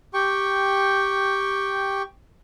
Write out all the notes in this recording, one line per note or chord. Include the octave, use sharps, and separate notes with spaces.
G4 G5 C#6